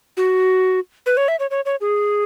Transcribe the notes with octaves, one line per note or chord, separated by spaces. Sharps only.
F#4
B4
C#5
E5
C#5
C#5
C#5
G#4